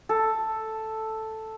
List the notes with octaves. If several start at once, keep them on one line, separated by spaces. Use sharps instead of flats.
A4